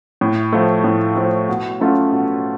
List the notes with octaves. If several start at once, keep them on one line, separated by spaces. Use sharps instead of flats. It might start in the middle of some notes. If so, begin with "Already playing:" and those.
A2
F3 A3
A2
F3 A3
B2
F#3 A3 C#4 F4
B2